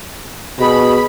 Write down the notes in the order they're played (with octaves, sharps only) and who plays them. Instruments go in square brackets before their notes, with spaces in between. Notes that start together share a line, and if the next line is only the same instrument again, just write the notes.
[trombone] B2 [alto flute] G#4 [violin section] B5